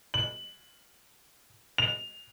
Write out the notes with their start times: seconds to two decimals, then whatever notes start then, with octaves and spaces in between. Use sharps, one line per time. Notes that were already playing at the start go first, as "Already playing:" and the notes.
0.14 F#7
1.78 F7